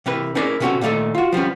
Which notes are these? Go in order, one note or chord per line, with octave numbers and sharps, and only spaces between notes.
C3 E3 A#4 B4
C#4 D#4 E4 G#4 A#4 D5
C3 B3 C#4 F4 F#4 A4
A#2 D#3 A3 D#4 A4
F4 F#4
F3 G3 B3 C#4